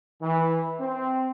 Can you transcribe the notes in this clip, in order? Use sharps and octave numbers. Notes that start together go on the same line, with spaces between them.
E3
C4